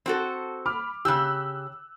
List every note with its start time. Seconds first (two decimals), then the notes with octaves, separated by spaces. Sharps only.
0.06 C4 F#4 A4
0.66 B5 D6 F6
1.05 C#3 G4 E6 F#6